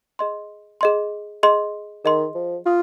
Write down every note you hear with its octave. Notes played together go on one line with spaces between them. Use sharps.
G#4 D#5 C6
G#4 D#5 C6
G#4 D#5 C6
D#3 G#4 D#5 C6
F3
F4 F5 C6 D#6